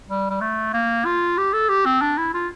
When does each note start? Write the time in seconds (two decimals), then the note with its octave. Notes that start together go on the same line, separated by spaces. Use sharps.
0.09 G3
0.30 G3
0.41 A3
0.73 A#3
1.06 F4
1.38 G4
1.53 A4
1.69 G4
1.86 C4
2.01 D4
2.18 E4
2.34 F4